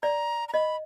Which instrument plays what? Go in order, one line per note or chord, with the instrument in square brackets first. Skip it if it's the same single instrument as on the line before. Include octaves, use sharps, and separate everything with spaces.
[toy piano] D5 [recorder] A#5
[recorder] A#5
[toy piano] D#5 [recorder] B5